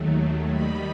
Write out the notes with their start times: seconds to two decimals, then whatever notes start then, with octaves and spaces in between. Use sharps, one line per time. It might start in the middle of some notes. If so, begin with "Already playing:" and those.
Already playing: D#2 D#3 F#3 A3
0.49 D#3 G3 D#4 B5